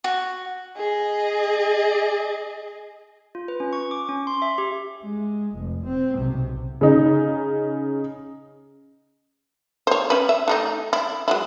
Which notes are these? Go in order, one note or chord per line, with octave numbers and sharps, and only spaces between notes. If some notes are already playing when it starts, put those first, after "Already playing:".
F#4
G#4 D#5
F4
B4
C#4
C#6
D6
C#4
C6
E5
G4
G#3
F1
C4
B1 C3
C#3 D#4
C5 C#5
C#4 B4
E5
E3 A3 D#4
E4
F#3 G#3 E4